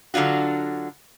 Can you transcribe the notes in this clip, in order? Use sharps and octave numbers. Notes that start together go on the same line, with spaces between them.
D3 F#3 D4 F4 F#4